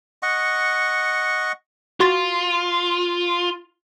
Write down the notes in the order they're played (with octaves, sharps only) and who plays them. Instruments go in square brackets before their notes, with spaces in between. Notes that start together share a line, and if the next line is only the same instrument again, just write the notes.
[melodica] D#5 F#5 C#6
[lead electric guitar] F4 [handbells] F#4 C6 A6